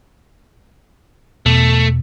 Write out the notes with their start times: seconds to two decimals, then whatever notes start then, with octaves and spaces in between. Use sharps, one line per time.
1.46 E2 B2 A3